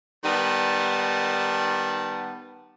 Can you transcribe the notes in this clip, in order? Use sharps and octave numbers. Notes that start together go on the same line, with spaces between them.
D#3 G3 B3 A5